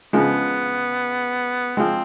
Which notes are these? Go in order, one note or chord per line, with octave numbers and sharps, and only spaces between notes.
C#3 F3 G#3 B3
F3 G#3 C4